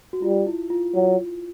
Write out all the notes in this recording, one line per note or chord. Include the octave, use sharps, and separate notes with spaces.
F#4
G3 F4
E4
F4
F#3 F4